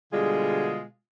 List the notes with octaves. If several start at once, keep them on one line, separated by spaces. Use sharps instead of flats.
B2 D3 G3 G#3 F4 G#4